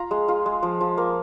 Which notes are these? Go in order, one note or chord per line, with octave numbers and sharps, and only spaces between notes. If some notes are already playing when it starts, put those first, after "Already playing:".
Already playing: F4 A#5
G#3
F4
G#3
F3
F3
A#3